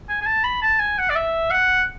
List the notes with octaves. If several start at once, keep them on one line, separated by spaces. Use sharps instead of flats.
G#5
G#5
A5
B5
A5
G#5
F#5
D5
E5
F#5